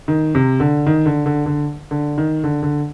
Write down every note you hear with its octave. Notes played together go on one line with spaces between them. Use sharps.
D#3
C3
D3
D#3
D3
D3
D3
D3
D#3
D3
D3